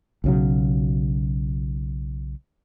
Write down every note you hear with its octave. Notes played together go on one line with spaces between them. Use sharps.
B1 C#3 F#3